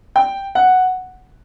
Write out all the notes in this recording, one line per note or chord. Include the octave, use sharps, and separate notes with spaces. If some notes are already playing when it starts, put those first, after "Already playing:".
G5
F#5